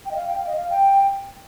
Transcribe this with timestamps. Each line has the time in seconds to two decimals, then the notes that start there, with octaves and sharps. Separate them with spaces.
0.06 G5
0.11 D#5
0.16 F5
0.27 G5
0.37 F5
0.46 D#5
0.56 F5
0.70 G5